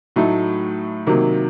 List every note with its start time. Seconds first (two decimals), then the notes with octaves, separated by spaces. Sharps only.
0.16 A2 F#3 A3 D#4
1.06 C3 D#3 F#3 A#3